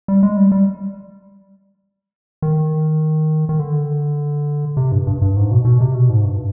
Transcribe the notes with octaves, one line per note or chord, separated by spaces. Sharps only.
G3
G#3
G3
G3
D#3
D#3
D3
C3
G2
G2
G2
G#2
B2
B2
C3
B2
G#2
G2